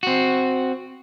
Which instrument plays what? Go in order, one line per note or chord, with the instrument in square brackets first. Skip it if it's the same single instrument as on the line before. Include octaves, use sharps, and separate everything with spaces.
[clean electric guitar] C4 F#4